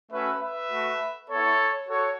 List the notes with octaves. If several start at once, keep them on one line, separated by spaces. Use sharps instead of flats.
A3 C#4 F#4 B4 E5
B4 E5
A3 F#4
B3 E4 A4 C#5
F#4 A4 C#5